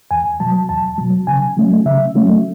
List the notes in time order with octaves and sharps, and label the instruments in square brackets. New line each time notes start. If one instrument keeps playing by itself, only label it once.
[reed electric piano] E2 G#5
B2 F#3 A5
E2 A5
B2 F#3
C#3 G#5
F#3 A3 C#4
C#3 E5
F#3 A3 C#4